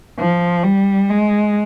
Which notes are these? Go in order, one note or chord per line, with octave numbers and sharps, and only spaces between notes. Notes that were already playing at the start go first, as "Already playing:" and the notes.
F3
G3
G#3